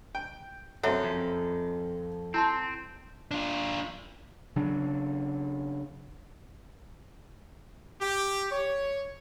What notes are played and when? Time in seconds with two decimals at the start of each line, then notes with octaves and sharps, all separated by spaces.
0.15 G5
0.83 F#2 C4 A4 C#5 E5 F#5
1.04 F2
2.34 C4 E4 A5 C6
3.31 D4 F4
4.56 C#3 F#3 D4
8.01 G4
8.51 C#5